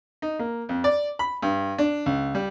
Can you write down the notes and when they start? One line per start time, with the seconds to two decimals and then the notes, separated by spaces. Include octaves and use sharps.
0.22 D#4
0.39 A#3
0.69 F2
0.84 D5
1.19 B5
1.43 G2
1.78 D4
2.06 C#2
2.35 G3